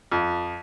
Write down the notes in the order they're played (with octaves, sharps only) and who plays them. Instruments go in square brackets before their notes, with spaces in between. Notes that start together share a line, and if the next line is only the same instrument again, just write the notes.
[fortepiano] F2